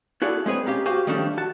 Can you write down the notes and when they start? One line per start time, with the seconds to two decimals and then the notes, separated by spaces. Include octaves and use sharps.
0.22 E4 F#4 G#4 A4 D5 F5
0.46 G#3 C4 G#4 B4 C#5
0.66 C#4 G4 F5 A#5
0.86 F#4 G4 C5 F5 G#5
1.07 D#3 F3 G3 A3 C#4 D4
1.38 F#4 A5